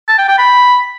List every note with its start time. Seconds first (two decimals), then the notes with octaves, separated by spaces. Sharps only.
0.08 A5
0.18 G5
0.28 G5
0.38 B5